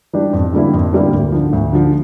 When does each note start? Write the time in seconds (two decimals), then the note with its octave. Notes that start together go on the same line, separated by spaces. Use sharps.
0.13 E3 G3 D4 G4
0.33 F2
0.53 D3 G3 A#3 E4
0.73 F2
0.93 D3 G3 A#3 E4
1.13 D2
1.32 D3 F3
1.53 D2
1.73 D3 F3